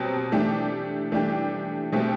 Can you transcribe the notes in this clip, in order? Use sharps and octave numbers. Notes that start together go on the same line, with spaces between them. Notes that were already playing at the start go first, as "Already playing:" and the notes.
Already playing: B2 F#3 C4 G4
E3 A3 D4 G4
E3 A3 D4 G4
B2 A3 C4 G4